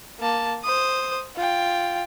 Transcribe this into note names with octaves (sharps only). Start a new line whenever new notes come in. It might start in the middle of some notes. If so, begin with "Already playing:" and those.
A#3 A5
C5 D#6
F4 G5